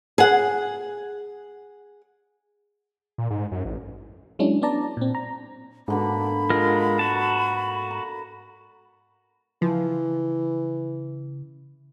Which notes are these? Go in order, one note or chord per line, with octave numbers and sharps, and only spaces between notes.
G#4 F#5
A#2
G#2
F#2
A1
F#3 G#3 C#4 D4 E4
B3 D4 D5 A5 A#5
A#2 C4
A#5
G#2 B2 D3 A#3 B5
G#3 F4 A#4
F#4 A5
A#5
C#3 E3 F3